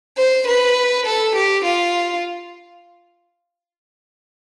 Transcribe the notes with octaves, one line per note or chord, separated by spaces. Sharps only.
C5
B4
A4
G4
F4